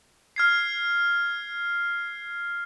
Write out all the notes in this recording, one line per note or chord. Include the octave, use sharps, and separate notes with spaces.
F6 G#6 C7